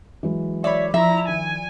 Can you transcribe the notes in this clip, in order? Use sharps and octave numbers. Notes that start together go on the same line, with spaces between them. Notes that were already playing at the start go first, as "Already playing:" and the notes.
E3 F#3 G#3
C#5 D5 E5 B5
F3 E4 E5 A#5
D#3 G#5